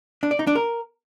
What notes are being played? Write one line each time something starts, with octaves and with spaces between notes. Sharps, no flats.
D4
D5
D#4
D4
A#4